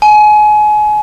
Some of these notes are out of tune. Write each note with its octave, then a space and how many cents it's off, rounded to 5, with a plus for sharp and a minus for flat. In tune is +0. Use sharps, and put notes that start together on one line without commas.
G#5 +30